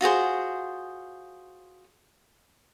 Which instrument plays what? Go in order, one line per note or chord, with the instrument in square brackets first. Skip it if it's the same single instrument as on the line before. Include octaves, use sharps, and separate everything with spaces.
[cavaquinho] F4 F#4 G#4 C5